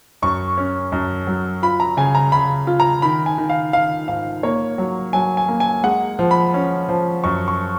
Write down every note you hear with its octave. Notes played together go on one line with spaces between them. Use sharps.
F#2 C#6
C#4
F#2
F#3
F4 B5
A#5
C#3 G#5
A#5
C#3 B5
F4
A#5
D#3 B5
G#5
D#3
F5
D#3 F5
G#2 F5
A#3 C#5
F#3
F#3 G#5
G#5
A#3
G#5
G#3 F#5
F3
B5
C#4
F3
F#2 C#6
C#6